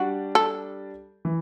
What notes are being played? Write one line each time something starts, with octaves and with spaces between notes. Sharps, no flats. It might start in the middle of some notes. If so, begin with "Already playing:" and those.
Already playing: G3 D4 F#4
A4
E3